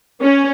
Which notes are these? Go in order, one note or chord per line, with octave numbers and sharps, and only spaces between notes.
C#4